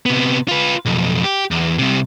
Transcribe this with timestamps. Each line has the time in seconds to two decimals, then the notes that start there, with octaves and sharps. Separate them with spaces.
0.06 C3 B3
0.48 F4 B4
0.86 B1 F2
1.24 G4
1.51 E2
1.79 C2 C3